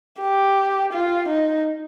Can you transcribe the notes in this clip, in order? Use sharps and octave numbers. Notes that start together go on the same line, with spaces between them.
G4
F4
D#4